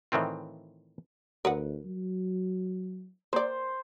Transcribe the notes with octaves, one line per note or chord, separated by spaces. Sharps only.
A2 D#3 E3 C4 F4
D2 A#4 B4 F#5
F#3
A#3 C5 D5